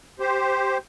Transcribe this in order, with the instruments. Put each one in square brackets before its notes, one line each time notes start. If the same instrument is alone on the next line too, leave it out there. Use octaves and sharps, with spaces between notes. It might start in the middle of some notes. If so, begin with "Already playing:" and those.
[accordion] G4 C5